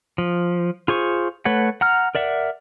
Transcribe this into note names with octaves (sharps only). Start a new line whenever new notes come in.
F3
F4 G#4 C5 C#6
A3 B4 C#5 F#5
F#5 A#5 F6
A#4 D5 E5 F#5